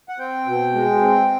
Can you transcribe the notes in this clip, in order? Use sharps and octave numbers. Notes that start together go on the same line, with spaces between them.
F#5
C4 G5
B2
G#3
C4